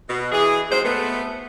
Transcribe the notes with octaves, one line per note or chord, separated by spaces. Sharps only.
B2
E3 G#4
G#2 F#3 G#3 C4 C5
A3 B3